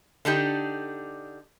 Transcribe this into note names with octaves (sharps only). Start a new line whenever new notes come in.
D3 D4 D#4 G4